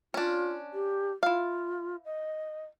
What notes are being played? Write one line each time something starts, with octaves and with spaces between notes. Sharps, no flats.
C#4 D4 F4
G4
E4 F4 F5
D#5